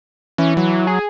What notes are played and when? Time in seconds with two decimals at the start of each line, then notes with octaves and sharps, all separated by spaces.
0.38 E3 C#4
0.57 F#3
0.87 G#4